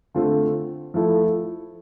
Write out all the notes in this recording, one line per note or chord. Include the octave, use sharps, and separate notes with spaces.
D3 A3 C4 F4 A4
F3 A3 E4 A4